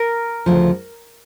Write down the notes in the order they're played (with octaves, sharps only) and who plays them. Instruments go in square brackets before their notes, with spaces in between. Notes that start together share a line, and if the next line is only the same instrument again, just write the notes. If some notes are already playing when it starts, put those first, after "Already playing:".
Already playing: [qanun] A#4
[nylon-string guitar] D2 C#3 F3